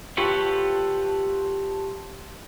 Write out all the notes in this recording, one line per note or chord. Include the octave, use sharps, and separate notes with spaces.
F4 G4 A4 B4 C#5 F#5